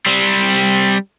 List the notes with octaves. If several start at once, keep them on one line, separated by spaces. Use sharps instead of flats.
G3 C4